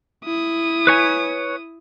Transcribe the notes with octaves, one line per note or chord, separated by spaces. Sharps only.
E4 D#6
B4 C#5 G#5